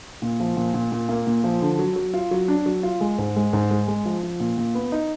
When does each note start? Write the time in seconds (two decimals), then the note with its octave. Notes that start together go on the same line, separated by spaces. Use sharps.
0.22 A#2
0.40 F3
0.57 A#2
0.74 A#2
0.92 A#2
1.09 A#3
1.27 A#2
1.44 F3
1.62 D3
1.79 F#3
1.96 F#3
2.14 F4
2.31 F#3
2.48 D4
2.66 F#3
2.83 F4
3.01 G#3
3.18 G#2
3.36 G#3
3.53 G#2
3.70 G#3
3.88 G#3
4.05 F3
4.23 F3
4.40 A#2
4.57 A#2
4.75 B3
4.92 D#4